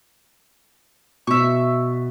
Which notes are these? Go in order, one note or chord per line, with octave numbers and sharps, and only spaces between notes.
B2 E5 C#6